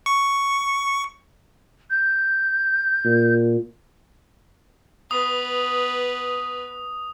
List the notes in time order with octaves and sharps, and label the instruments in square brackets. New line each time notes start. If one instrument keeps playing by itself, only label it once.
[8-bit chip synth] C#6
[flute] G6
[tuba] A#2
[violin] B3 B4 [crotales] D#6